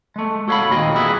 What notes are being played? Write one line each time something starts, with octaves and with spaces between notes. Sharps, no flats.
G#3 A3
F#4 A4 C#5 E5 F5 B5
D#2 A#2 C4 D#5
G3 A#3 E4 G#4 B4